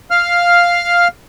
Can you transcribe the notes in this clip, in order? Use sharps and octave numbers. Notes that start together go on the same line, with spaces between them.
F5 F6